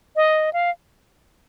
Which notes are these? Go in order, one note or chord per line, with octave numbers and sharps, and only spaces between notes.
D#5
F5